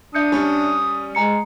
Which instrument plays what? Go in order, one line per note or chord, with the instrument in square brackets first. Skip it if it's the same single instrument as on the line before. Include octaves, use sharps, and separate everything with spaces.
[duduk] D4 [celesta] E5 G6 C#7 [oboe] D#6
[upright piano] G3 C#4
[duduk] G#3 [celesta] G#5 A#5 C#7